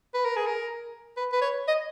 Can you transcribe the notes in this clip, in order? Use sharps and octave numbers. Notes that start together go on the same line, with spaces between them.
B4
A#4
G#4
A#4
B4
B4
C#5
D#5